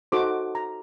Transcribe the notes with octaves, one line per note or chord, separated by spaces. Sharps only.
D#4 F#4 A4 C5 D6
A#5